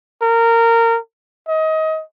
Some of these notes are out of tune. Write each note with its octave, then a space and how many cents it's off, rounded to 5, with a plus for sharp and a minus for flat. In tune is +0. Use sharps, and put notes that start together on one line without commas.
A#4 -20
D#5 +25